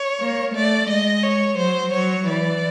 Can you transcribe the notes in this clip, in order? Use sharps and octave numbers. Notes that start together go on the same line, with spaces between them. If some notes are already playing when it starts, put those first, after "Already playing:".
Already playing: C#5
A#3
A3 D5
G#3 D#5
C#5
F#3 C5
F#3 C#5
E3 D5